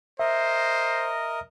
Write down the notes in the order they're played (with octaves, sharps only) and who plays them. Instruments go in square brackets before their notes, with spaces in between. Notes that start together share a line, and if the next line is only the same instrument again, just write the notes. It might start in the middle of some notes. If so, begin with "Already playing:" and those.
[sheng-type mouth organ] A#4 D#5 [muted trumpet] C5 [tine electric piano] E5